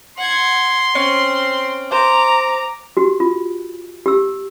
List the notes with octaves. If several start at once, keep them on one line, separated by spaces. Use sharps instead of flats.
F#5 C6 G#6
C4 C#4
C5 A#5 D6
F#4 G4
F4
G4 E6